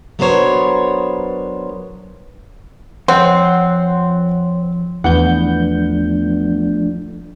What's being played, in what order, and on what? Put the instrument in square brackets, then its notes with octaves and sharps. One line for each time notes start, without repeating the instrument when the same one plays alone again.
[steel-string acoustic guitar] F#3 B3 D4 A#4 C5 C#5
[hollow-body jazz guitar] F2 [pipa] C4 [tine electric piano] C5 C#5 [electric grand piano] F#5 C6
[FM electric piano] E2 B3 G6 [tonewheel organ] F3 A3 D4 [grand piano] F#5